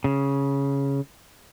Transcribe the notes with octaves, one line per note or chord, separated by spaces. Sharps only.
C#3